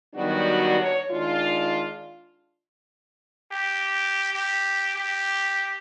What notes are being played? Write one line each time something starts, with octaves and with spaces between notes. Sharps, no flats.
D#3 F#3 G3 B3 D4 F#4
C#5
D#3 G#3 D4 F4
G4
G4
G4